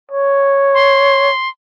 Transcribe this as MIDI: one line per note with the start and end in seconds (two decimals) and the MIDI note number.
0.11 1.30 73
0.74 1.49 84